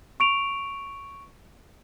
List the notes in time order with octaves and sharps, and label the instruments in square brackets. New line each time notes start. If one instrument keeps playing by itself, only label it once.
[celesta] C#6 D7 F7